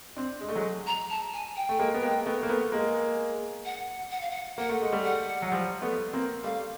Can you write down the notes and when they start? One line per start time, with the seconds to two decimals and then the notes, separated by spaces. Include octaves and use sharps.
0.17 C4 D4
0.41 G#3
0.48 A3
0.55 F#3 G#3
0.87 A#5
1.10 A5
1.34 G#5
1.57 G5
1.69 A3
1.79 G#3 A#3
1.94 B3
2.03 G#3 A#3
2.26 A3 B3
2.43 A#3
2.49 A3 B3
2.72 G#3 A#3
3.65 F#5
4.11 F#5
4.21 F5
4.31 F#5
4.58 A#3 F#5
4.69 A3
4.82 G#3
4.92 G3 A3
5.05 F#5
5.42 F#3
5.52 F3 G3
5.82 A3 B3
6.13 A#3 C4
6.44 G3 A3 F5